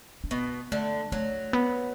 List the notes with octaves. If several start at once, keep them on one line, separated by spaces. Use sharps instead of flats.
D4
B2 B3
D3 A3
F#3 A3
B3